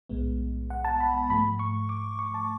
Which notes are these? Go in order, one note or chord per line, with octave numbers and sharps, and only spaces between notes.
B1 A2 G#3 B3
F#5
A5
B5
A5
G#2 F3 A3 B5
C#6
D6
C#6
A5